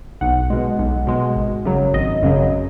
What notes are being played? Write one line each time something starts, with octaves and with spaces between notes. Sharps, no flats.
B1 F#5
B2 G#3
B1
B2 G#3
G#1
F#2 C#3 F#3
G#1 D#5
F#2 C#3 F#3